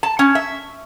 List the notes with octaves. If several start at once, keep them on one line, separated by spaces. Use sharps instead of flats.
A5
C#4
E5